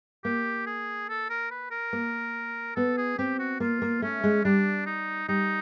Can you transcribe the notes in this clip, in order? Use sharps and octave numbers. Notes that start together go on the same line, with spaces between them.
A#3 G4
G#4
A4
A#4
B4
A#4
A#3
B3 A4
G#4
C4 G4
F#4
A#3 F4
A#3
A3 C#4
G#3
G3 D4
D#4
G3 D#4